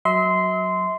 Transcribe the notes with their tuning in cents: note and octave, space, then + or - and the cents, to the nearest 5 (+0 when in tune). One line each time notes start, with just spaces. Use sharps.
F#3 +0 E5 -40 C6 -15